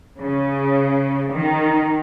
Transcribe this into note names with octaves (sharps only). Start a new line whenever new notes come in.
C#3
D#3